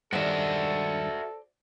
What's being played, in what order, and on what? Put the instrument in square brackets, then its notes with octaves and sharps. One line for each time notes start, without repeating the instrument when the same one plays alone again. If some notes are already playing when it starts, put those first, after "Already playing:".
[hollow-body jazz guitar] G2 D#3 [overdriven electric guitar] F#4 E5 [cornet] A4 [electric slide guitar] C5 D5